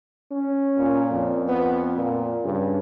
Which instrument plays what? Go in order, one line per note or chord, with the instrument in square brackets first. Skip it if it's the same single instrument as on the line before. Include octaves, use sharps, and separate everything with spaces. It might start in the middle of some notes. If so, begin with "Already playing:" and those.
[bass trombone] C#4
[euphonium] A#2
[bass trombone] F2
[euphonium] B3
A#2
[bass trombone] G2 [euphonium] C#3